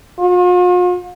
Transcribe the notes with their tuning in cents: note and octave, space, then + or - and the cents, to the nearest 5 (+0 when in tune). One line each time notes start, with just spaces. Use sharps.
F4 +45